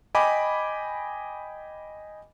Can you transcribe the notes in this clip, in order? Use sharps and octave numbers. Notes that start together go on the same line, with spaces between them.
D#5 G5 G#5 B5 D6